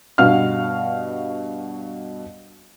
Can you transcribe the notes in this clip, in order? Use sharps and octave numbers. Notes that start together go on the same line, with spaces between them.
G2 B2 F#4 F5 F6